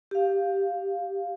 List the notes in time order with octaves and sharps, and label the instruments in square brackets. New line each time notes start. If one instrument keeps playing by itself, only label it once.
[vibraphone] G4 F5